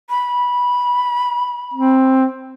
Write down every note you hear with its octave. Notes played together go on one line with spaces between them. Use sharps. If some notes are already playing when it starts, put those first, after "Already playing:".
B5
C4